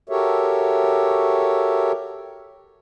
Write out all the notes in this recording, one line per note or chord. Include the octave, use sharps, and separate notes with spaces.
F#4 G4 A4 A#4 C#5 E5